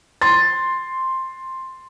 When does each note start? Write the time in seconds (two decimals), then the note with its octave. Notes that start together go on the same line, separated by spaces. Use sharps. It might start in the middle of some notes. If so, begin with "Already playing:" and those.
0.22 C6 A6